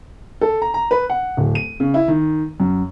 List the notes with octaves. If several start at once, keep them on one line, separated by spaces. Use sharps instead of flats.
A4
A#5
A#5
B4
F#5
D1
D#7
C#3
E4
D#3
F#2